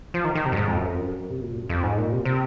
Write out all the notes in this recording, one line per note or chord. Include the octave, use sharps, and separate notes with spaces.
F3
D#3
D#3
C3
F#2
G#2
F2
F#2
F2
F#2
C3
A#2
F#2
F2
G#2
A#2
C3
A#2
C3